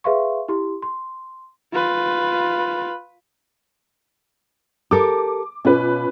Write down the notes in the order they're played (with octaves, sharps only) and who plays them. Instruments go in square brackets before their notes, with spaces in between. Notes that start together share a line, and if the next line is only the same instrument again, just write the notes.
[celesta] G#4 B4 E5 F5 C6 C#6
E4 G4 C6
C6
[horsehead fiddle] F4 B4
[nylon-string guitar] G4 A4 A#4 [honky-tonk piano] D6
[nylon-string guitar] B2 [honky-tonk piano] C#4 F4 B4